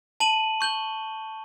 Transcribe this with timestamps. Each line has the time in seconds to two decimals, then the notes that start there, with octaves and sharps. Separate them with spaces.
0.20 A5 D#7 F#7
0.61 C#6 G6 F#7 G7